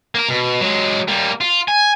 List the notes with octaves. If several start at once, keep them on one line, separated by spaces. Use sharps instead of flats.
A#3 A#4
B2
F#3 G#3
G3 A#3
F4
G#5